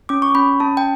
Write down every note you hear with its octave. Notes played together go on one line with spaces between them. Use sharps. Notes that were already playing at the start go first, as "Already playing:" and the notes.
C#4 D6
C#6
C#4 B5
C#4 A5
G5